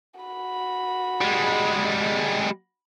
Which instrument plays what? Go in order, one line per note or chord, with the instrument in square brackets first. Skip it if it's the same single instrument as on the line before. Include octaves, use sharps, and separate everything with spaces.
[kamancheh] F#4 B5
[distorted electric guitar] G3 G#3